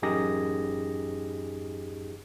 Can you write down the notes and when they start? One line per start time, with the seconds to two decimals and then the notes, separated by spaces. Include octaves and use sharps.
0.02 A1 F#2 D#4 G4 G#4 A#6